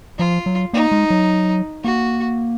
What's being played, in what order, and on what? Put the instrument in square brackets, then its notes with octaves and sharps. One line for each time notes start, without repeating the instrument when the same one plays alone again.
[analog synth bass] F3 [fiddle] F4
[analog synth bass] F#3
[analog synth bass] A#3 [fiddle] D#4
[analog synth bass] G#3
F#3
[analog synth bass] A#3 [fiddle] F#4